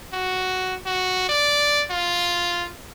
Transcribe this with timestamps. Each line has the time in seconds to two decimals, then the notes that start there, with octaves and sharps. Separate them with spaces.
0.13 F#4
0.86 F#4
1.29 D5
1.91 F4